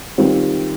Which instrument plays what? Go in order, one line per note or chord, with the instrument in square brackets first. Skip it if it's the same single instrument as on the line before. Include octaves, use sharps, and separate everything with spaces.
[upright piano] D#3 G3 C4 F4